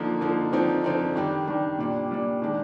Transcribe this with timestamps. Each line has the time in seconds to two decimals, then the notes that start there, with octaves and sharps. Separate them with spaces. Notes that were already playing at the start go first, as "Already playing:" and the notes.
Already playing: D3 F3 A#3 D#4
0.21 D3 F3 A#3 D#4
0.53 D3 F3 C4 D#4
0.84 D3 F3 C4 D#4
1.16 D#3 G3 D4
1.47 D#3 G3 D4
1.79 A#2 G3 D4
2.11 A#2 G3 D4
2.42 D#3 G#3 D4